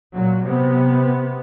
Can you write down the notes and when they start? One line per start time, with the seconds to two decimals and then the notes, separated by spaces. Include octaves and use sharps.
0.14 A#2 F#3
0.45 C3 B3